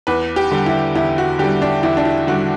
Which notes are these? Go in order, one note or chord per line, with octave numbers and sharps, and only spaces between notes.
E2 B4
G4
D3 G3
E4
E2 E4
F#4
D3 G3 G4
D4
E2 E4
D4
E4
D3 G3 F#4